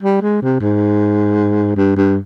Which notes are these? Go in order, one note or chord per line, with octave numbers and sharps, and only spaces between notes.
G3
G#3
C3
G#2
G2
G2